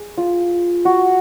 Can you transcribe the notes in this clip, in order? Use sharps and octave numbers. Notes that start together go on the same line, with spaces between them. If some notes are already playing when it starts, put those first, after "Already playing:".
Already playing: G#4
F4
F#4